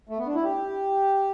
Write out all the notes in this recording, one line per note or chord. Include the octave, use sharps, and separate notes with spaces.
A3
B3
D4
E4
G4